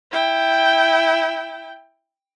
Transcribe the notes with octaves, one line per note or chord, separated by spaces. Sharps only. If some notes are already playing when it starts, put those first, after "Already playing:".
E4 G5